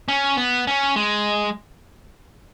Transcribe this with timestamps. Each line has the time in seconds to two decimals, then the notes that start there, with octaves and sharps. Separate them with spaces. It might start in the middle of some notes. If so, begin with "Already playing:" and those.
0.08 C#4
0.37 B3
0.67 C#4
0.96 G#3